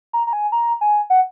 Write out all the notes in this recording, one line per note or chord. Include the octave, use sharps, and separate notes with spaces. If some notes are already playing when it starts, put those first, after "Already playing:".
A#5
A#5
G#5
A#5
G#5
F#5